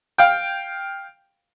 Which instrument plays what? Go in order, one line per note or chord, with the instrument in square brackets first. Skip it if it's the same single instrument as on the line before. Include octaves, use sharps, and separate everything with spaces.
[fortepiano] F5 G5